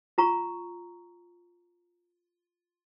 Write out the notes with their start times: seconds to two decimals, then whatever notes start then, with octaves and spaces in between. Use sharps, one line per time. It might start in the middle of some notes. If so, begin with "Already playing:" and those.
0.18 F4 A#5 C#6